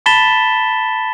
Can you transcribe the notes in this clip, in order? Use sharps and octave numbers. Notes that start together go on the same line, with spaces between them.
A5 B5 A6 B6 E7 G7